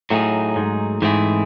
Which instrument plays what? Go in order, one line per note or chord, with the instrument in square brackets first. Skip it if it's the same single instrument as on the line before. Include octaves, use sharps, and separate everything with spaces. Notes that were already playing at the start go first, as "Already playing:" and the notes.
[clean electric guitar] A2 [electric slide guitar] F#3 A3 D#4 G#4
[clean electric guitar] G#2
[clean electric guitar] G#2 [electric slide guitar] E3 A3 C4 E4 G#4